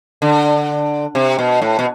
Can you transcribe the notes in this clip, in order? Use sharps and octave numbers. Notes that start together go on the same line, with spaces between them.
D3
C3
B2
A2
B2